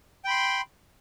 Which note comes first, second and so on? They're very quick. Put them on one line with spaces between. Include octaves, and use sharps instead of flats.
G5 B5 C6